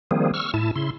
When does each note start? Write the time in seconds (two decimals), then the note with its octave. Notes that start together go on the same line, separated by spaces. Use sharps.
0.11 D#3 F3 G3 A#3 C4 G#4
0.34 C#6 E6 F6
0.54 A2 E4 A5
0.76 C#3 E4 C6